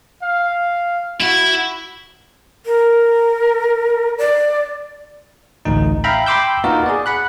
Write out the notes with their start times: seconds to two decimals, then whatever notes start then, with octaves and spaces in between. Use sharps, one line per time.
0.23 F5
1.21 E4 F#4
2.66 A#4
4.18 D5
5.65 A1 D2 D#4
6.04 E5 F5 G5 A#5 B5
6.26 G5 B5 C6 D6 E6 G6
6.64 A#3 B3 D#4 F4 F#4 A#4
6.86 G#4 D5
7.06 F#5 B5 F#6